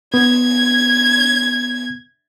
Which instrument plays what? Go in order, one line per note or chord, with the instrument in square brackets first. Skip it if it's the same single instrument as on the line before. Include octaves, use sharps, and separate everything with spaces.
[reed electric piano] B3 [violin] G#6